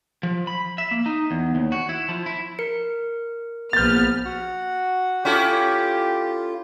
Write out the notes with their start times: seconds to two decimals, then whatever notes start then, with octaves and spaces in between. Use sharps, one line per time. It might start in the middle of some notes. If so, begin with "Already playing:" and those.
0.23 F3
0.47 B5
0.78 E5
0.91 A#3
1.06 D#4
1.31 E2
1.55 D#2
1.72 F#4
1.89 E4
2.09 F3
2.26 E4
2.59 A#4 C#7
3.73 A#1 B3 F6 G6 A6
4.25 F#4 F#5
5.25 C#4 E4 F4 G4 A4